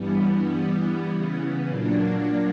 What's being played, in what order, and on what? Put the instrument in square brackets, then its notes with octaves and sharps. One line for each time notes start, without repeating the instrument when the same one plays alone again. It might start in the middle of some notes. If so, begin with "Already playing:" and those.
Already playing: [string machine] G2 E3 G3 B3
E3 G3 B3
C#3 E3 B3
A#2 F#3 A#3 D4